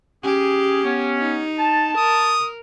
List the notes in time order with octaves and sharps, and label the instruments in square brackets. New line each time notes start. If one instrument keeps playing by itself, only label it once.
[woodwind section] C#4 G#4 [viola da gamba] G4
[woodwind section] B3 C#4
[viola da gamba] D#4
[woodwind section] A5
[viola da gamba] A#4 [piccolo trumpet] D#6